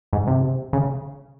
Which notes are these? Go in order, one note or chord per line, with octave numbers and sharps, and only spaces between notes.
G#2
C3
C#3